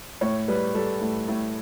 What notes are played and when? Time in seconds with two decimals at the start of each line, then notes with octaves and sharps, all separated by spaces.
0.21 A2 C#5
0.48 G3 B4
0.75 G3 A4
1.01 A2
1.28 A2